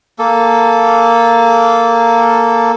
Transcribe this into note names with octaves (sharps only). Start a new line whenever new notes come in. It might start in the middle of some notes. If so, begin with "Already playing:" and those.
A#3 A4